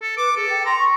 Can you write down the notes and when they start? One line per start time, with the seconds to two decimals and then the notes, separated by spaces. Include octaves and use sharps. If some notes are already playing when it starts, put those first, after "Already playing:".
0.02 A4
0.17 B4 D6
0.36 G#4 A4
0.50 G5
0.66 A#5 C6
0.79 C#6